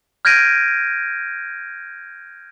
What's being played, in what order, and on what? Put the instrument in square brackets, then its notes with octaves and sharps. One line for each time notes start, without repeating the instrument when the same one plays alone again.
[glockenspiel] F6 G6 G#6 A#6 D7 D#7